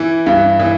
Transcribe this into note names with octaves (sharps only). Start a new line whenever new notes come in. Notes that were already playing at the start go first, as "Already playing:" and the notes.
Already playing: E3 E4
G2
E3